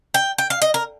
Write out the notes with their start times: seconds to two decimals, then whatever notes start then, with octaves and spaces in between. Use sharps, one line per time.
0.14 G5
0.38 G5
0.50 F5
0.62 D#5
0.74 A#4